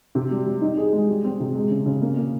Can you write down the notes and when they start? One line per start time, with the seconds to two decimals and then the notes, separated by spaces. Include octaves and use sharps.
0.15 C3
0.31 G3
0.46 G3
0.61 D#4
0.77 G#4
0.93 G#3
1.09 G3
1.24 C4
1.40 C3
1.55 G#3
1.70 C#3
1.86 C#3
2.02 A#3
2.17 A#3